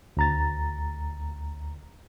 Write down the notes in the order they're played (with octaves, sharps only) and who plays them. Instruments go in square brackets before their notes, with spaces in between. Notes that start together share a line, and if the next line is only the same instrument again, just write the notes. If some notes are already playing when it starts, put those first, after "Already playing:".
[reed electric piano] D2 A#5 A6